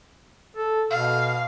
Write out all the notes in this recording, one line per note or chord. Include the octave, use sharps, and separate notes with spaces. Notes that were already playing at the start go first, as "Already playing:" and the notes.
A4
B2 F5